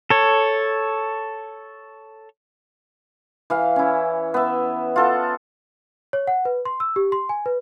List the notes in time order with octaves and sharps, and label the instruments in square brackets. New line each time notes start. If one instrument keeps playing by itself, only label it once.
[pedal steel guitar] A4 C#5
[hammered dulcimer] E3 F5
C#4 E4
B3 E5
F4 A4 F#5
[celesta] C#5
F#5
B4
C6
E6
G4
C6
G#5
B4